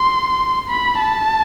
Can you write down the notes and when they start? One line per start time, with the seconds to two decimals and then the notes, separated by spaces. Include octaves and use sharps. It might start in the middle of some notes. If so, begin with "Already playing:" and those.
Already playing: C6
0.70 B5
1.00 A5